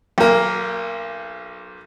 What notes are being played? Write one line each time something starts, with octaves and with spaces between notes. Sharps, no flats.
B1 A#3